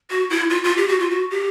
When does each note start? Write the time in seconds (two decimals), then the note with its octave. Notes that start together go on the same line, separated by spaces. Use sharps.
0.10 F#4
0.30 E4
0.50 F4
0.64 F4
0.77 G4
0.88 F#4
0.99 F4
1.10 F#4
1.31 G4